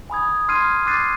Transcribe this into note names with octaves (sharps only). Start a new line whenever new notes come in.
G#5 B5 D#6 G#6
C6 F6 G#6 C7 D#7
D6 F#6 A6 C7 D#7